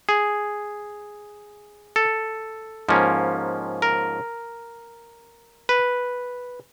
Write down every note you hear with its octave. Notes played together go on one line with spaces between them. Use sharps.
G#4
A4
G#2 F3 A#3 C#4
A#4
B4